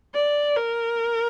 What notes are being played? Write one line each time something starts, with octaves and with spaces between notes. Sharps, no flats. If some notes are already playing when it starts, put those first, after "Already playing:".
D5
A#4